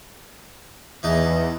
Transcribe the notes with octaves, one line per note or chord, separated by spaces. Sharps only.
E2 E3 D#4 A5